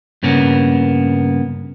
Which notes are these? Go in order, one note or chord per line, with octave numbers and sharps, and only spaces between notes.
G2 C#3 A#3 B3